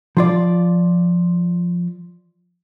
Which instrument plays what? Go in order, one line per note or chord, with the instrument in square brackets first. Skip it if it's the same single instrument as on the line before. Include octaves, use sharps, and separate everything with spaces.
[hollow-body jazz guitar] F3 F4 D5